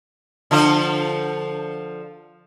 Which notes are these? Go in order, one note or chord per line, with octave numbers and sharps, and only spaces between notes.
D3 F3 C5